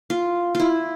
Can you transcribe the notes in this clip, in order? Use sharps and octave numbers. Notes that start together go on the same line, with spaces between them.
F4
E4 F4